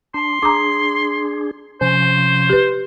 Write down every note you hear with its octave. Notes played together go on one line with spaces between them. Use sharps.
D4 C6
D4 G#4 A#5 D6
C3 F3 C#4 C5
G4 B4